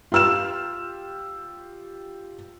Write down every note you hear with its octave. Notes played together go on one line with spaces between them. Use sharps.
F4 G4 E6 F6 E7